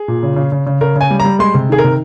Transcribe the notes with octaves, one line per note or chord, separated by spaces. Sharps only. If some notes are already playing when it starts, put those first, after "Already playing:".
Already playing: G#4
A#2
C#3
C#3
C#3
C#3
C#3 A#4
C#3 G#5
G3
A#5
G3
G#3 C6
C3
D#3 G#4
A#4
C3